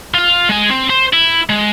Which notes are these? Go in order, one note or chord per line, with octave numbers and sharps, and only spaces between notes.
F4 F5
G#3 G#5
C4
C5
E4
G#3